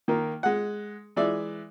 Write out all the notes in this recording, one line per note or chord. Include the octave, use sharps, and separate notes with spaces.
D#3 A#3
G#3 F#5
E3 G#3 D5 E5